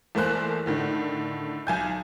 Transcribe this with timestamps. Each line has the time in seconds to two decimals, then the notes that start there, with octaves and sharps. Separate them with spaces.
0.15 E2 A3 A#3 C5 F#6
0.66 A2 D3 D#3
1.67 B1 G#5 G6